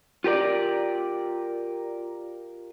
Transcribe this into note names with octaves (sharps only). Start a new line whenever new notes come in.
F4 G4 A#4 D5